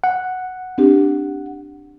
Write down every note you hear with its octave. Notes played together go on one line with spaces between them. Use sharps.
F#5
C4 D4 G4